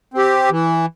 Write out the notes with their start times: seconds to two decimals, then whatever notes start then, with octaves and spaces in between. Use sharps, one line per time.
0.14 C4 G4
0.50 E3